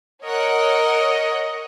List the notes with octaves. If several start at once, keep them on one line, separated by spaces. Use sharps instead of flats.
A#4 C#5 D#5 F#5